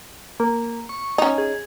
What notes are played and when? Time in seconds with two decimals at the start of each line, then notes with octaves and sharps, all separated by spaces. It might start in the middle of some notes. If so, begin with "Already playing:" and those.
0.40 A#3
0.89 C#6
1.18 C#4 D#4
1.38 G#4